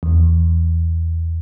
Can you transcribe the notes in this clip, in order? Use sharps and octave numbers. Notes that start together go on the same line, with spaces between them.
E2